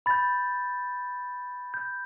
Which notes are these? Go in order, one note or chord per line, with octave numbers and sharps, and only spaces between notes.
B5 G6 A6
G6